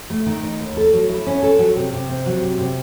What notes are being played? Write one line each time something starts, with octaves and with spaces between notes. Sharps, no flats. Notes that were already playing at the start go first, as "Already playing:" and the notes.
A3
D#3
D#4
D#2
A4
F#3
E4
C#4
A4
F#3
C3
C3
C4
F#3
C3
C3